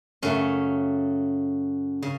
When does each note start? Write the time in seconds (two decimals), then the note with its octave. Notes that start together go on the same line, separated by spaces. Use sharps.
0.22 F#2 C#3 A3 C#4
2.02 C#3